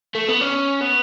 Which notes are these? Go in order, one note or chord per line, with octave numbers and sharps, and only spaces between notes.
A3
B3
C#4
B3